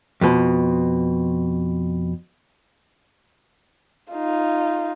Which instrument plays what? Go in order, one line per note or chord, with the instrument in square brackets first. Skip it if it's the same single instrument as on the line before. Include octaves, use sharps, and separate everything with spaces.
[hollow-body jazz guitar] F2 B2
[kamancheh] D#4 F4